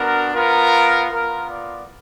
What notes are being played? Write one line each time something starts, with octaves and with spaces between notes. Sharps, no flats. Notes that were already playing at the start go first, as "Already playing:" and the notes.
Already playing: B3 D4 F#4 A#4
B3 F4 A#4
B3 F4 A#4
D5